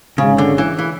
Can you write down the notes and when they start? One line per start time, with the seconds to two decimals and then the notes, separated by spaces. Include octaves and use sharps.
0.18 G#1 G#2 C#3 G#3 C#4 G#4
0.38 D3
0.58 E3
0.78 E3